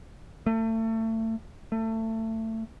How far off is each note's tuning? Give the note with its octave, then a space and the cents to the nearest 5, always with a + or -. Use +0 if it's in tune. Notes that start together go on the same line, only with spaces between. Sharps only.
A3 +30
A3 +25